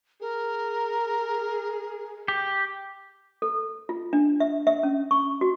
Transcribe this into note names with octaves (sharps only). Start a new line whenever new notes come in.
G#4 A#4
G4
A4
F4
D4
E5
E5
C#4
C#6
F#4